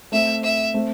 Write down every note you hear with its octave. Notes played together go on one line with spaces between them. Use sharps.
A3 C4 E5
E5
A3 C4